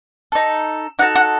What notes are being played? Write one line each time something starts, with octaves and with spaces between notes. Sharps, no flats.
D#4 A4
D#4 F#4 A4 F#5
F#5